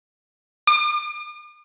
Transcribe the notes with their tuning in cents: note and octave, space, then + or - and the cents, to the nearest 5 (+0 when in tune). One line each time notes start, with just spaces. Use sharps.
D6 +45